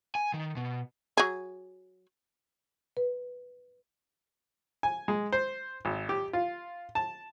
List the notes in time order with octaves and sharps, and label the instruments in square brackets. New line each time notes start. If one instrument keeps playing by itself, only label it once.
[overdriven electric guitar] G#5
D#3
B2
[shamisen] F#3 G#4
[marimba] B4
[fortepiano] G#5
G#3
C5
G#1
G4
F4
A5